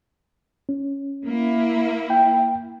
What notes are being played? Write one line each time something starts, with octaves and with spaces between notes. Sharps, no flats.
C#4
A#3 E4
G5